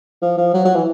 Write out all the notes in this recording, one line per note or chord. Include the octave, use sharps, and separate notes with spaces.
F3
F3
F#3
F#3
E3